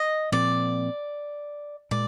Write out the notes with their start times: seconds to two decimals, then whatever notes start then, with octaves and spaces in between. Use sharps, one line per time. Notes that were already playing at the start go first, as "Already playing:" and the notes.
Already playing: D#5
0.32 A#2 F3 C4 D5
1.91 A#2 G#3 D5